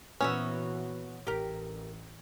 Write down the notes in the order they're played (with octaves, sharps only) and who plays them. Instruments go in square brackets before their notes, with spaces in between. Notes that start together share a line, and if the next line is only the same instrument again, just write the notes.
[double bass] A#2 E3 [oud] B3 F#4 E5 [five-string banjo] C#4
[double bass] A1 [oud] G4 A#4